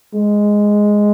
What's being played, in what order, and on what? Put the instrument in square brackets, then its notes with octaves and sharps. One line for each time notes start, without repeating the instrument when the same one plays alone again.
[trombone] G#3